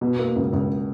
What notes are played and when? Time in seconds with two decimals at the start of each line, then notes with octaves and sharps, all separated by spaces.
0.01 B2
0.19 A#3
0.36 C#2
0.53 C#2